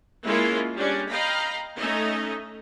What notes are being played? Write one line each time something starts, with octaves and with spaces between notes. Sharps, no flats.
G#3 A#3 C#4 E4 F4
G3 C#4 D4 D5
D#5 F5 G5 A#5 B5
A3 C#4 D#4 D#5 E5